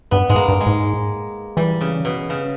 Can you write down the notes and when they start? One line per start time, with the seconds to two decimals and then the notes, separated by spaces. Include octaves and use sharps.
0.11 G2 B3
0.30 G#2 G#3
0.36 A#3
0.48 G2
0.61 G#3
0.67 G#2
1.57 E3 G3
1.81 C#3
2.05 B2
2.30 C#3